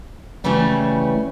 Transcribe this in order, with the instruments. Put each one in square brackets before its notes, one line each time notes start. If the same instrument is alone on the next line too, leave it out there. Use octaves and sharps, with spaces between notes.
[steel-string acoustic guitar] C#3 E3 G3 A3 C#4